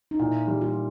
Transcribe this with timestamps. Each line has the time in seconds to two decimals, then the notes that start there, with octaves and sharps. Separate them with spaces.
0.11 D#4
0.19 A#2 E4
0.47 G3
0.61 F4